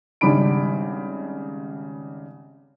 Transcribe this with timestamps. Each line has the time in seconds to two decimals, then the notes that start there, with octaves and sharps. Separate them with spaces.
0.21 G#1 C#3 G3 D4 B5 D7